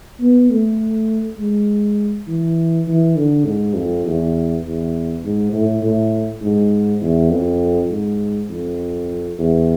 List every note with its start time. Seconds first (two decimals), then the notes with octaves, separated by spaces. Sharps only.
0.21 B3
0.50 A3
1.38 G#3
2.27 E3
2.87 E3
3.16 D3
3.46 G#2
3.76 F2
4.05 E2
4.65 E2
5.24 G#2
5.53 A2
5.83 A2
6.42 G#2
7.02 E2
7.30 F2
7.91 G#2
8.50 F2
9.39 E2